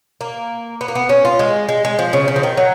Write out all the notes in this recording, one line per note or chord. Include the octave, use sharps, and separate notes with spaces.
A#3
B3
A#3
B3
C#4
F4
G#3
G#3
G#3
F3
C#3
C#3
F3
D#3
F#3